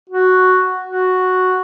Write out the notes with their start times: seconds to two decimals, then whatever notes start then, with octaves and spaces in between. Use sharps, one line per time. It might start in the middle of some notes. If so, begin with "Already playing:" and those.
0.09 F#4
0.87 F#4